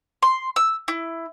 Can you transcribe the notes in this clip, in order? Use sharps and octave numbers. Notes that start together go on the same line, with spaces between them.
C6
E6
E4